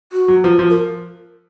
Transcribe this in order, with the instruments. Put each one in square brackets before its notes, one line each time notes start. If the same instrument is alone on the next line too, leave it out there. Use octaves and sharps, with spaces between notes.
[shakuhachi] F#4
[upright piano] F#3
F3
F3
[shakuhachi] A#4